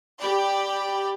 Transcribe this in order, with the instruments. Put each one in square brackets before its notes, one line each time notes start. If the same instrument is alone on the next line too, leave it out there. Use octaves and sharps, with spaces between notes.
[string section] G4 D5 G5 B5